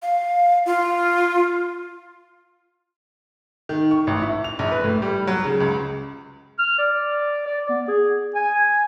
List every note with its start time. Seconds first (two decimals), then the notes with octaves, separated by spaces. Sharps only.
0.02 F5
0.66 F4
3.69 D#3
3.91 C#6
4.07 A1
4.22 E4
4.44 F7
4.59 A#1
4.71 B4
4.84 A2
5.02 G3
5.27 F#3
5.44 C#3
5.60 C#2
6.59 F6
6.78 D5
7.46 D5
7.69 B3
7.88 G#4
8.35 G#5